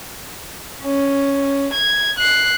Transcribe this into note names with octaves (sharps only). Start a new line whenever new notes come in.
C#4
G#6
F#6 C7